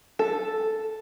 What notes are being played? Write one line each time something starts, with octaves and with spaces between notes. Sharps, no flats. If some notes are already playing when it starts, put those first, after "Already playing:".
A4